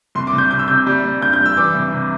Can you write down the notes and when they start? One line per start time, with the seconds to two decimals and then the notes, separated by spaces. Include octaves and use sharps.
0.15 C2 C6
0.27 D6
0.33 C2
0.38 G6
0.51 C3 G6
0.59 E6
0.68 C3 G6
0.87 G3
1.04 G3
1.22 G2 G6
1.33 G6
1.40 G3
1.46 E6
1.57 E3 D6
1.75 C2
1.93 C3